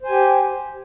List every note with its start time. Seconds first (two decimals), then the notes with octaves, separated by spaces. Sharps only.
0.03 C5
0.06 G#5
0.09 G4